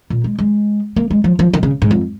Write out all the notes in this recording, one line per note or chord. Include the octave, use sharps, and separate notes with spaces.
A#2
G#3
G#3
A#3
G#3
F3
F3
D#3
C#3
G#2
F2